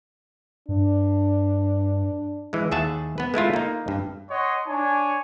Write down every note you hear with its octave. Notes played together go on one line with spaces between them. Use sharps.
G2 D4
E3 G#3
D#2 G#4 E5 F#5 A5
B3 B4
G#3 A3 E4 F4
A#3 D#4
G2
C#5 D#5 F#5 C6
D4 C#5 G#5